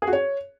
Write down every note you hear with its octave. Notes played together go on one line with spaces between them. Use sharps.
G#4
F#4
C#5